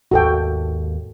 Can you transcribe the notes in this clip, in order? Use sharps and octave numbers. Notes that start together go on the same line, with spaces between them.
G#1 D#2 F#4 A4 G5